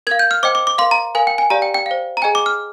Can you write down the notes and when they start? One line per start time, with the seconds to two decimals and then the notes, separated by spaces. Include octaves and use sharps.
0.07 A#4 F5 G#6
0.19 G6
0.31 F6
0.43 C5 D#5 G5 D6
0.55 D6
0.67 D6
0.78 A#4 F5 C6
0.91 A#5
1.15 A#4 F5 G#5
1.27 G5
1.38 G#5
1.50 G4 D5 F5 A#5
1.62 G5
1.74 G5
1.86 C5 F5
2.17 A#5
2.22 G#4 D#5 G5 G#5
2.35 D6
2.46 F6